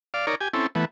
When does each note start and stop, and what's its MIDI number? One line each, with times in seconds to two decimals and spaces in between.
0.14 0.26 74
0.14 0.26 77
0.27 0.35 63
0.27 0.35 70
0.27 0.35 73
0.27 0.35 74
0.41 0.48 67
0.41 0.48 80
0.54 0.67 60
0.54 0.67 61
0.54 0.67 64
0.54 0.67 69
0.75 0.85 52
0.75 0.85 57
0.75 0.85 59